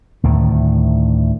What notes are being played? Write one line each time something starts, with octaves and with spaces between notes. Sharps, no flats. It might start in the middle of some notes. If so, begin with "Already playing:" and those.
D2 A2 D#3